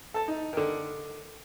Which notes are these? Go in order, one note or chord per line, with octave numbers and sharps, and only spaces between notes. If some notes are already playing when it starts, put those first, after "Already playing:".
A4 A5
D#4
D3 D#3